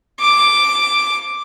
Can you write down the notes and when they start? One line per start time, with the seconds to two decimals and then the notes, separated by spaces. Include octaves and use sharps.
0.20 D6